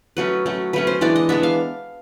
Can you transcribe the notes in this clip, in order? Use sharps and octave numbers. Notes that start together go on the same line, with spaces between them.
F#3 A3 C#4 B4
F#3 A3 C#4
F#3 A3 C#4 B4
C5
E3 G#3 B3 D4 D5
D#5
E3 G#3 B3 D4 E5
F5